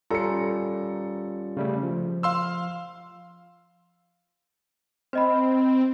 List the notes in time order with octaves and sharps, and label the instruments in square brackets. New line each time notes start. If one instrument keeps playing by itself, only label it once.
[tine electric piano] G3 C#4 F4 [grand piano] A4 C#7 [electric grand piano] A#5
[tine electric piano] C#3 G3 A3
F3
[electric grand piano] F5 C6 E6
[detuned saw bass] C4 [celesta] C5 D#5 B5